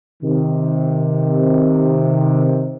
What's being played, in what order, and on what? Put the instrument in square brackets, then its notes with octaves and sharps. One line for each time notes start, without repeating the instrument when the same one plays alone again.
[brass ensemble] C3 D#3